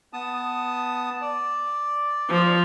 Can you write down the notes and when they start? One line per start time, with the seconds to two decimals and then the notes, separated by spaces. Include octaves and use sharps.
0.13 B3 A5 D#6
1.21 D5
2.30 F3